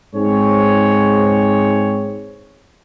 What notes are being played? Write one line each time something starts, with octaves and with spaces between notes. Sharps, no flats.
G#2 C4 G#4 C#5